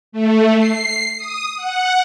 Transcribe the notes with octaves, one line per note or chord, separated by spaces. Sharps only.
A3
C7
D#6
F#5